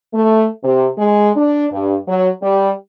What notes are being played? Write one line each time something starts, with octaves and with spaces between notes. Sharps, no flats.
A3
C3
G#3
D4
G2
F#3
G3